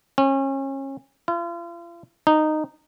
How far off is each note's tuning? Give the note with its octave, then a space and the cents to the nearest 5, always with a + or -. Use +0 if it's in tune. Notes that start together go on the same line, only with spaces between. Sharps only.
C#4 -30
F4 -40
D#4 -15